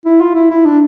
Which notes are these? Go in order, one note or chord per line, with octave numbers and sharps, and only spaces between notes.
E4
F4
E4
E4
D4